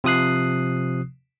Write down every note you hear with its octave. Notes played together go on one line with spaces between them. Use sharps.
C3 F3 D#6 F#6 C7